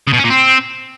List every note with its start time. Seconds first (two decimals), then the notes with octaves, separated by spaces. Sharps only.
0.07 C#3
0.13 B2
0.19 C#4
0.24 A#2
0.30 C4